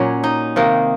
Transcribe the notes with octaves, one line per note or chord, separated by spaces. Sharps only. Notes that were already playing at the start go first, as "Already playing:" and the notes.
Already playing: A#2 F#3 C#4
D#4
C3 D#3 A#3